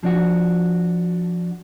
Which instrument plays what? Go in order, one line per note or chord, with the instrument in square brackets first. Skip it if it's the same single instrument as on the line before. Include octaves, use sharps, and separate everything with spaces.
[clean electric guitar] F3 D4 F#4